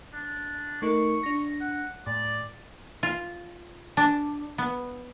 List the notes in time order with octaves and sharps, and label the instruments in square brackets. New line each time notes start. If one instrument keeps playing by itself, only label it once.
[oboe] D4
[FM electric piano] A3 D#4 A#4 [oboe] C#6
[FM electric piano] D4 A#6
[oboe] F#5
[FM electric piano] A2 [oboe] D5
[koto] F4
D4
B3